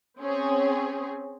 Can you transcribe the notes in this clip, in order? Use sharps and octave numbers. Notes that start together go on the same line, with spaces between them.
C4 C#4 G#4